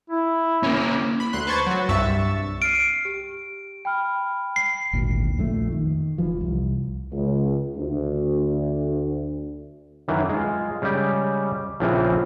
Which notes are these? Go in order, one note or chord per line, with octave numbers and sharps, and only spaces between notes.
E4
A#3 C#4
B5
D2 C6 F#6
B4 C5 A5 C#6 G#6 A6
F#3 F#4
C2 G2 E5 C#6 E6 A6
F6 C7 D7 D#7
G4
G5 B5 F6
C7
G#1 D2 A#2
A#1 F2 D#3 A3
D#3
F1 E3 F3
C2
C#2
D2
F#2 D#3 E3 F#3
G#3 F4
C#3 G3 G#3 G4
A#1 C#3 E3 F3 C4 G#4